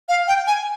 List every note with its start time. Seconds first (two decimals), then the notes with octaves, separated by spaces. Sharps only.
0.09 F5
0.28 G5
0.47 G#5